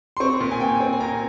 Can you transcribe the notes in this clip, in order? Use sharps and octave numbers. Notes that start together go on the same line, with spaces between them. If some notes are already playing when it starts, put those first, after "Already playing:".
C6
C4 C#6
A#2
G#5
A#2 G5
C4
G#5
A#2 A#5